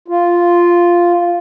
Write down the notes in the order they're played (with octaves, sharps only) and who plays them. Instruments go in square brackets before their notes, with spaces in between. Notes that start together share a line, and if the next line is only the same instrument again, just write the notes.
[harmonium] F4